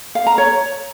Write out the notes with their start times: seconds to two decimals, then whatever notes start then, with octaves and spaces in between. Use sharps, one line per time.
0.15 F5
0.27 A#5
0.38 C#5